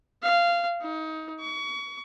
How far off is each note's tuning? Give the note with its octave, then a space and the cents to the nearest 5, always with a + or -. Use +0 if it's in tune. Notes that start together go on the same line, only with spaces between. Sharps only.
F5 -15
D#4 +25
C#6 +30